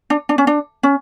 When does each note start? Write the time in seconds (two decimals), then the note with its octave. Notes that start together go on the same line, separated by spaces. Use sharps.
0.10 D4
0.29 D4
0.38 C#4
0.47 D4
0.83 C#4